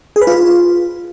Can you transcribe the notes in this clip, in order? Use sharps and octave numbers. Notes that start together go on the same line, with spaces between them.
G#4
B4
F4